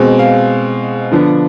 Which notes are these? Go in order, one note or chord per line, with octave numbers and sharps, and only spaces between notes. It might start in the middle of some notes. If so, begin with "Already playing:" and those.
Already playing: B2 G#3 C4
F5
D3 F3 B3 D4